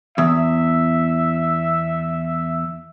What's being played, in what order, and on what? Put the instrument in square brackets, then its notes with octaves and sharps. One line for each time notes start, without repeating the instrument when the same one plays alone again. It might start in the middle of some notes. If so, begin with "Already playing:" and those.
[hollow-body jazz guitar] E2 [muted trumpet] E5